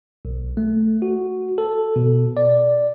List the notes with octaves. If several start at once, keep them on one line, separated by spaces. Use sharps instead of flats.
B1
A3
F#4
A4
B2
D5